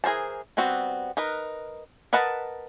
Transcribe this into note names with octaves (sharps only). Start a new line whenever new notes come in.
E3 G#4 A#4 C5 A5
G3 B3 C4 F#4
D#4 A#4 B4
A#4 B4 D#5 F#5 A5